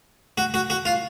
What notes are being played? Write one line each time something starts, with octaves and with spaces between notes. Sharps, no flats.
F#4
F#4
F#4
F4